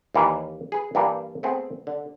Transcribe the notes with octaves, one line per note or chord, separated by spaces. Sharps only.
D#2 E3 G3 A#3
G#4 B4
G2 E3 G3 A#3 D4
A3 B3 C4 G#4
D3